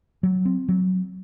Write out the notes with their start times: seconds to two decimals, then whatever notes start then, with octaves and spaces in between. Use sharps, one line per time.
0.23 F#3
0.45 C4
0.68 F#3